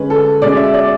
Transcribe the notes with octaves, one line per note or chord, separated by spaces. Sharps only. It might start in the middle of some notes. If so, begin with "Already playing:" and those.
Already playing: D3 G#3 C#4 B4
A4
B2 G#3 C#4 D5
E5
D5